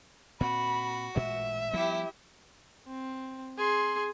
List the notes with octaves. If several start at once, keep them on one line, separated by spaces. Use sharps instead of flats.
A#2 C4 F#4 B5
A1 A#2 G#3 E5
F3 G3 B3 E4 G4
C4
G#4 C6